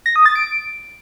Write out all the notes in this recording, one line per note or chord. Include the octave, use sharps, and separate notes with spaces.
A#6
D#6
A6
D7